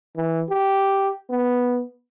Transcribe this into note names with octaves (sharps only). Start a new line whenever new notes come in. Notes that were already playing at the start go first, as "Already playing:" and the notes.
E3
G4
B3